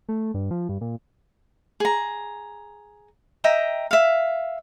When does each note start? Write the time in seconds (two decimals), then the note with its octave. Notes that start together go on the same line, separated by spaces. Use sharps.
0.09 A3
0.34 G2
0.51 F3
0.69 G2
0.81 A#2
1.80 G#4 A#5
3.44 D#5 E5 G5 A#5
3.91 E5 F5